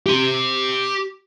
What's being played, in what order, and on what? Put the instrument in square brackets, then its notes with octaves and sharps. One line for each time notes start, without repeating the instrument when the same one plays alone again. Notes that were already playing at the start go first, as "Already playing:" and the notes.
[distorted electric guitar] G4 C6